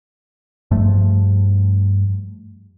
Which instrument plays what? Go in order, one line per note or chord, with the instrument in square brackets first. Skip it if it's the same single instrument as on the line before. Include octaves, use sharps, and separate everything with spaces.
[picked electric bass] G2 F3 A3